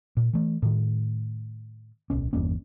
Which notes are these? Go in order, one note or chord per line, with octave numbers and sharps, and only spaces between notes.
A#2
E3 A3
A2 D#3
D1 B1 C#4
G1 E2 A#3 C#4